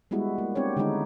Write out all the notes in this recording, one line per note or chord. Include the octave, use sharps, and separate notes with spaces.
G3 G#3 B3 E4 F#4
A#3
B3 C4 D4 G4 C#5
D3 D#3 G3 G#3 D#4 E4